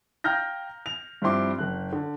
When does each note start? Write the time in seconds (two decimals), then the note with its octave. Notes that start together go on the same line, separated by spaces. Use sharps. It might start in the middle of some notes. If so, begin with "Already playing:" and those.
0.24 F5 G5 A#5 F6 G6 A#6
0.86 F7
1.22 G2 F3 C4 E4 C6 D6
1.59 F#1 F#6
1.93 D3